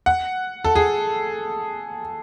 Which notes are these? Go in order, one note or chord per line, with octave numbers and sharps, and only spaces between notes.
F#5
A4
G#4